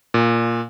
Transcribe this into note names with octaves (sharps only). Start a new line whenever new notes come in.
A#2